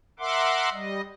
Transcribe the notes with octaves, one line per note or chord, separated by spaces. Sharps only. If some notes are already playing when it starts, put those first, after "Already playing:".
A#4 E5 F#5 C6 D6
G3 D#5